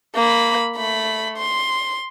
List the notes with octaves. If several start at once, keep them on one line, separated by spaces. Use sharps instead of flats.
A#3 B5
A3 B5
C6